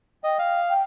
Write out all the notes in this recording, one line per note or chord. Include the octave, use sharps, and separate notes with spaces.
D#5 G5
F5
G5